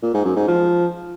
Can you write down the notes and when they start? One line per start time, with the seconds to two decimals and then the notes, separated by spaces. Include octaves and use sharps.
0.03 A#2
0.14 G#2
0.25 F#2
0.36 G#2
0.48 F3